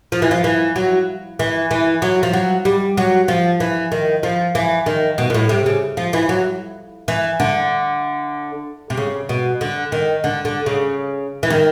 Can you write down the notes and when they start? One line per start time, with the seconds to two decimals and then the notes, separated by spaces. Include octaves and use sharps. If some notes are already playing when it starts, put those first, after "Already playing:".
0.12 F3
0.22 E3
0.31 F3
0.44 E3
0.76 F#3
1.39 E3
1.71 E3
2.02 F#3
2.23 F3
2.33 F#3
2.65 G3
2.97 F#3
3.28 F3
3.60 E3
3.92 D#3
4.23 F3
4.55 E3
4.86 D#3
5.18 B2
5.30 A#2
5.34 A2
5.49 C3
5.66 C#3
5.97 F3
6.13 E3
6.29 F#3
7.08 E3
7.40 D3
8.90 C3
8.97 C#3
9.29 B2
9.61 D3
9.92 D#3
10.24 D3
10.45 D3
10.66 C#3
11.43 E3
11.50 D#3